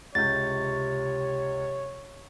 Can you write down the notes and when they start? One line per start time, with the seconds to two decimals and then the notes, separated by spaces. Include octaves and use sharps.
0.15 C#2 C3 C#5 G6 A6